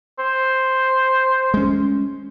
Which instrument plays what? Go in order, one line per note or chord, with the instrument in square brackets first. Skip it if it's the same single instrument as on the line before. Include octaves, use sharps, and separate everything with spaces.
[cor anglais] C5
[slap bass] G#3 C#4